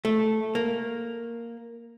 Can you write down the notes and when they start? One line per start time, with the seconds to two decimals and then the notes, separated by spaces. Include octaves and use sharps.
0.05 A3
0.55 A#3